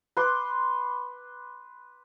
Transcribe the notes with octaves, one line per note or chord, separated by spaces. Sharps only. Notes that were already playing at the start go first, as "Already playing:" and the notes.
B4 C6 D6